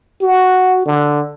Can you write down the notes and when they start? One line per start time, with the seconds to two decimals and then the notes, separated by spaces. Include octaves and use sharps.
0.22 F#4
0.86 D3